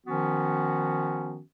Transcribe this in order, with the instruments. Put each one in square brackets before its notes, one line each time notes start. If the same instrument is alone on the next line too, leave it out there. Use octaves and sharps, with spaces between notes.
[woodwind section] D#3 F3 B3 C#4 F#4